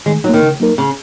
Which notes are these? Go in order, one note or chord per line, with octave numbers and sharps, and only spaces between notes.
D#3 G#3
D#3 F#3 A#3 D#4
C#3
F#3 A#3 D#4 A#4
C#3